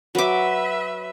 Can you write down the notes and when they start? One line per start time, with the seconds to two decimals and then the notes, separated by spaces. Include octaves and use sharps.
0.15 F#3 B4 E5 D6